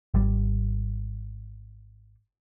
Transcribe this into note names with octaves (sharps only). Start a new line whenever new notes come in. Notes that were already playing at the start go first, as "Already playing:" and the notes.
G#1 G3